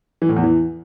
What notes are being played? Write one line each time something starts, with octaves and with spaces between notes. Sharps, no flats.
E3
A2
E2
E3